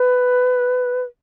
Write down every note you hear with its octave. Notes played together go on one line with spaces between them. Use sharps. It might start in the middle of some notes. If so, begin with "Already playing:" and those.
Already playing: B4